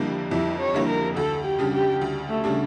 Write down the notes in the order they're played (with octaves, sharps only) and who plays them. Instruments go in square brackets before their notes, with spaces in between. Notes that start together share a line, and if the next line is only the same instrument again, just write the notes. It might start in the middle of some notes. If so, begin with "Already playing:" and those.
Already playing: [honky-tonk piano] F2 D3 G3 A#3 E4
[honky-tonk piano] F2 [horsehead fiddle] E4
[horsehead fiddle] C#5
[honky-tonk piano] D3 G3 A#3 E4
[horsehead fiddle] A#4
[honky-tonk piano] D2 [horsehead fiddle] A4
[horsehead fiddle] G4
[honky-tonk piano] C#3 G3 D4
[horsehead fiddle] G4
[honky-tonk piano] D2
[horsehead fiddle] A3
[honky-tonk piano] C#3 G3 D4